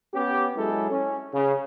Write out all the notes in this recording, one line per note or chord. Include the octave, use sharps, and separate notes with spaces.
B3 C#4 G4
F#3 G#3 E4 G#4 A4
C#4
C#3